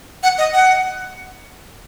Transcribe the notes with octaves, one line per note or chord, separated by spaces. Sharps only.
F#5
D#5
F#5